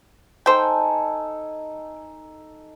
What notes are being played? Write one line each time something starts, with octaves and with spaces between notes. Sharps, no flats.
D#4 A4 C5 G5 G#5